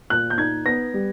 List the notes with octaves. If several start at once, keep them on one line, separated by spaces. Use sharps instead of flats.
A#2 F#6
G6
D#4 G#6
B3 A#6
G3